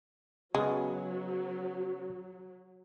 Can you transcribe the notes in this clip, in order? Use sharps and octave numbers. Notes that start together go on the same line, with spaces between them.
C#3 F#3 G#3 B3